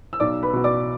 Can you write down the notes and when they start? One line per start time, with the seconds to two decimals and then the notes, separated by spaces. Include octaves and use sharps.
0.13 E6
0.20 B1 D5 D6
0.43 B4 B5
0.53 B2 B3
0.64 D5 D6